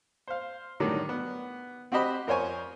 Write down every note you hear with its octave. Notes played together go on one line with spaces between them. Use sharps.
C5 F5
A2 D3 D#3 F#3 G3 A3
B3
C4 F#4 G4 C5 D#5 B5
F2 A#4 C5 C#5 G#5 C#6